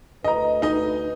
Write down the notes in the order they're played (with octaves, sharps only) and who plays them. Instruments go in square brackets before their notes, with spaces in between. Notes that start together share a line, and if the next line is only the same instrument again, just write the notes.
[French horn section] D2 B4 [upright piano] D#5 A#5
[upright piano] D#4 D#5